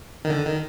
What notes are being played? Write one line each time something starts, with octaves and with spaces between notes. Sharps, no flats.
D#3
D3
D#3